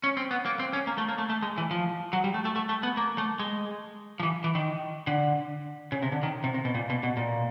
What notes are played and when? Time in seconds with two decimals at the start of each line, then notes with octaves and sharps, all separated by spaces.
0.04 C#4
0.17 C4
0.31 B3
0.45 A#3
0.59 C4
0.73 C#4
0.87 A#3
0.98 A3
1.09 A#3
1.18 A3
1.30 A3
1.42 G#3
1.58 E3
1.71 F3
2.13 F#3
2.24 G3
2.34 A3
2.45 A3
2.56 A3
2.69 A3
2.83 B3
2.97 A#3
3.18 A3
3.39 G#3
4.20 F3
4.23 E3
4.44 E3
4.55 D#3
5.07 D3
5.92 C#3
6.02 C3
6.12 D3
6.23 D#3
6.44 C3
6.54 C3
6.65 B2
6.75 A#2
6.90 B2
7.03 B2
7.17 A#2